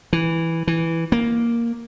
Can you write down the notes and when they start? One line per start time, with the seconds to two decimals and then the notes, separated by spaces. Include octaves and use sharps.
0.13 E3
0.67 E3
1.12 A#3